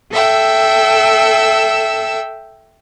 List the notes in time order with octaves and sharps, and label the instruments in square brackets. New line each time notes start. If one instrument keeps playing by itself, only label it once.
[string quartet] A4 E5 G5 E6